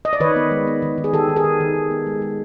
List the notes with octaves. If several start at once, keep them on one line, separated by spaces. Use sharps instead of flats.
D#5
D5
D#3 B4 C#5
B3
G#3
B3
D#3
D#3
G#4
D#3 G4 A4
D#3
G#4 A#4
D#3
D#3
D#3
B3
G#3
G#3